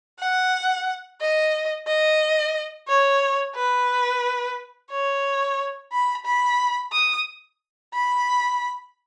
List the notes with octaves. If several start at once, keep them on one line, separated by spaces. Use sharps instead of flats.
F#5
D#5
D#5
C#5
B4
C#5
B5
B5
D#6
B5